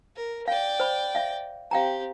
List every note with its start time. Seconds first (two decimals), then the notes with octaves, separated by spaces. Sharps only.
0.16 A#4
0.48 D5 F5 G5
0.80 C5 B5
1.15 E5 F5
1.71 C4 G4 F5 G5 A#5